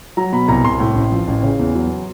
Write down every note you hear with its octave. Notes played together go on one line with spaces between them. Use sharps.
F#3 A#5
B2 B5
C2 A#5
C2 C6
A2
A1
F3
A1
C#3
E2
F#3